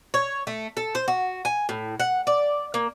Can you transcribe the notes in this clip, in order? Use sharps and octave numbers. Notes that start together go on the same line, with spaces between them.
C#5
A3
A4
C5
F#4
G#5
A2
F#5
D5
A#3